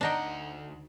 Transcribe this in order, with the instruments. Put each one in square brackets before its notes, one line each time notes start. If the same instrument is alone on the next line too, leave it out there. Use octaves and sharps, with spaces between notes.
[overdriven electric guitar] D2 F#5 [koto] D4 D#4 G5